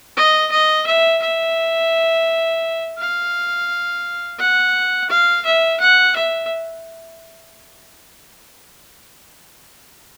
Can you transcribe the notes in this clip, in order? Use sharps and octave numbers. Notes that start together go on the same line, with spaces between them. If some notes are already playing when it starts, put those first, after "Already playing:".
D#5
D#5
E5
E5
F5
F#5
F5
E5
F#5
E5